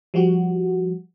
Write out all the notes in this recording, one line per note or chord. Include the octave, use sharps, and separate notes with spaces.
F3 G3 F#4